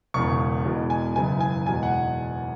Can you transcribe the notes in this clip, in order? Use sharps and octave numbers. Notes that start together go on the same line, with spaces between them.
E1 E2 C#3 C#6
E2 B2 G#3
G#5
F#1 F#2 C#3 E3 G#5
G#5
E2 B2 G#3 G#5
F#5